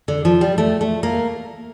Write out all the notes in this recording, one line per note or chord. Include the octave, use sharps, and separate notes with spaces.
D3
F3
G3
A3
A3
A#3